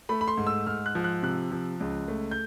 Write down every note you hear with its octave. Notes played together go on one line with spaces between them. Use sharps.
A3 B5
B5
C6
G#2
E6
G#2 F6
F#6
F3
F#6
C3 F#6
F3
C#2
A3
G6